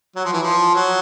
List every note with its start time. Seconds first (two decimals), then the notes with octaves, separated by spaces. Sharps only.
0.16 F#3
0.24 F3
0.33 E3
0.42 F3
0.75 F#3